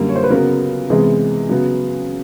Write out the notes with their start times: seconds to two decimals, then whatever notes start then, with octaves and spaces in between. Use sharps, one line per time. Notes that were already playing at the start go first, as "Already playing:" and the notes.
Already playing: F#2 D3 G3 A#3
0.09 C#5
0.16 C5
0.24 B4
0.30 C#3 F#3 B3 A#4
0.90 C3 E3 G#3 B3 G#4
1.49 C#3 F#3 B3